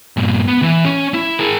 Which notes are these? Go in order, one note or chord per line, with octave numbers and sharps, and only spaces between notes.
G2 A#2
B3
E3
C#4
E4
G#4 A#4